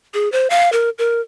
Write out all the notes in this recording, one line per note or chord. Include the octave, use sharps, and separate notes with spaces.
G#4
C5
F5
A#4
A#4